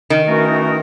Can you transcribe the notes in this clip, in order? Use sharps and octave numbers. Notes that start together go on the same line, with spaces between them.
D#3
E3 A3 C#4 F#4 A#4